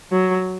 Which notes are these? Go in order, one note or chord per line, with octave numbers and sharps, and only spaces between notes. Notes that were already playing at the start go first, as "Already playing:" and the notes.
F#3